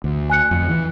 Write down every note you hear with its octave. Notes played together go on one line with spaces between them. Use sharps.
D2
G#5 F#6 C#7
F2
E3